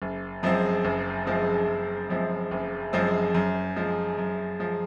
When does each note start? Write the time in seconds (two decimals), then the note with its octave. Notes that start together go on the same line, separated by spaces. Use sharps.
0.02 F#1
0.43 F#2 F3 G#3 C4
0.85 F#1
1.26 F#2 F3 G#3 C4
1.68 F#1
2.09 F#2 F3 G#3 C4
2.51 F#1
2.93 F#2 F3 G#3 C4
3.34 F#2
3.76 F3 G#3
4.18 F#2
4.59 F3 G#3